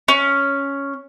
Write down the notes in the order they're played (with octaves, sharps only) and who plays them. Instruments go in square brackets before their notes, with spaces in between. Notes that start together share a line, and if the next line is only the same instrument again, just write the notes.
[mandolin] C#4